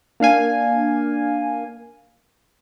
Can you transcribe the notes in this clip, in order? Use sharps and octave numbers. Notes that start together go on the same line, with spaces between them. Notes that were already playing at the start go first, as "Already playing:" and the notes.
A#3 D4 F5 G#5